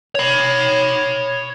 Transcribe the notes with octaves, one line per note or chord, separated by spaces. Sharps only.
C#5 B5